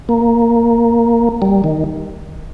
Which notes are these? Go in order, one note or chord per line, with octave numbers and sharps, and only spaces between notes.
A#3
G3
D#3